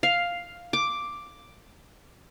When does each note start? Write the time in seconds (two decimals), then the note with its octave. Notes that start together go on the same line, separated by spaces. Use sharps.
0.03 F5
0.73 D6